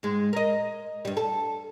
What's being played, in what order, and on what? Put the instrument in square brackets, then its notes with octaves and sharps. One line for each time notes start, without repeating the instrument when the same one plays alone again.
[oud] G#2 G#3
A#4 D#5
G2 G3
A4